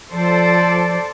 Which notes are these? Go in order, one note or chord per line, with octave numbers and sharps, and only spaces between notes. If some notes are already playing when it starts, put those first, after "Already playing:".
F3 A4 C5 D5